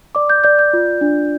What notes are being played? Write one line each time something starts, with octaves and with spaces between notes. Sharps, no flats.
D5 D6
G6
D5 G6
G6
F4
D4